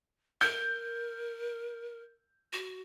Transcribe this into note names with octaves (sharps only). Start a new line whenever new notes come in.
A#4 G6
F#4